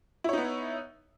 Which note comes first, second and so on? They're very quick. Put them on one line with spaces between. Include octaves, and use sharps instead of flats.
E4 C#5 D#4 B3